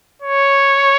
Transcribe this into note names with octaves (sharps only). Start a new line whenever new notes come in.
C#5